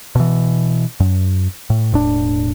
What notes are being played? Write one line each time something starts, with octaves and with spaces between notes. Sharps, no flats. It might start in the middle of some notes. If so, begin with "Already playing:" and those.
B2 E3
F#2
A2
E1 A2 D4